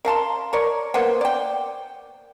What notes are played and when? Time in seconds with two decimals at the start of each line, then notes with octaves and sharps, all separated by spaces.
0.05 A#4 F5 A5 C6
0.53 A#4 C#5 D5
0.94 A#3 B3 C5 F#5
1.21 D5 G5